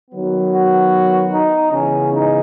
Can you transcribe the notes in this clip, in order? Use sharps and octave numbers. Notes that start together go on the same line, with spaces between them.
D#3 F#3 B3
F#4
D#4
C#3 E3 G#3 B3 C#4
D#4